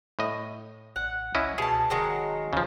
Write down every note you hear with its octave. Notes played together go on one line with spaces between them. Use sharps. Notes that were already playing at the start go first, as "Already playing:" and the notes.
A2 D#5
A1 F#5
C#2 C#4 E4 D#5
B2 G#4 A5
D1 D#3 F#3 G#3
D2 C#3 F3